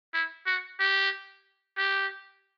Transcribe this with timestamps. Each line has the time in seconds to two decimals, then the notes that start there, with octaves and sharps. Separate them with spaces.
0.14 E4
0.46 F#4
0.79 G4
1.77 G4